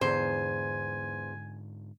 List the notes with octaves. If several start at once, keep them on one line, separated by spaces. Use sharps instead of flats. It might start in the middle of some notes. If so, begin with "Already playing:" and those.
E2 G#2 D3 C5 G#5